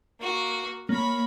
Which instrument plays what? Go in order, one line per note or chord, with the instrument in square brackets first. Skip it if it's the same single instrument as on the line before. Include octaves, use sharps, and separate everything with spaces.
[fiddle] A#3 F#4
[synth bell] A#3 [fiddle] C#5 B5